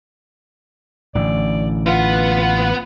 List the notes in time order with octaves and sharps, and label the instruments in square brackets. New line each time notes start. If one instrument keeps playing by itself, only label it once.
[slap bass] A1 A2 D3 [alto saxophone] D5
[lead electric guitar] B3 F#5 [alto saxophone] F4